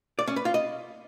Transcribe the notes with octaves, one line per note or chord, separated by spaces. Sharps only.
D5
C#4
B4
F4
D#5